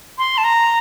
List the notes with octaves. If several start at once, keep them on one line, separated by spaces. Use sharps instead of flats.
C6
A5
A#5